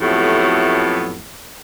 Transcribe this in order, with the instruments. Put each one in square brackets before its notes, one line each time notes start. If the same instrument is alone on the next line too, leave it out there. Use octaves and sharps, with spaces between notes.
[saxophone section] F2 A2 F#3 A3 B3 G4